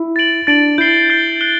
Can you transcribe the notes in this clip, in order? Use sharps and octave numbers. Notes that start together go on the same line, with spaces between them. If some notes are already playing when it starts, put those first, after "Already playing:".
Already playing: E4
A6 D7 F#7
D4 A6 D7 F#7
E4 G6 C7 G7
G6 C7 G7
F#6 C7 G7